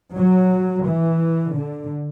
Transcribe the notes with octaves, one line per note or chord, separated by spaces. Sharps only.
F#3
E3
D3